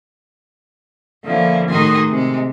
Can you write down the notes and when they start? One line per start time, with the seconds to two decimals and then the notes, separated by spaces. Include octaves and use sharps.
1.25 D3 F3 A#3 C#4 E4
1.70 A2 D#3 D#4 F#4 G#4 C6
2.09 C3 G#3